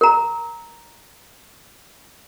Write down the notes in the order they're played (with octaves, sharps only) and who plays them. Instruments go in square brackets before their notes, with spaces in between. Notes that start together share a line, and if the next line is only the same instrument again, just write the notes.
[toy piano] A#4 A#5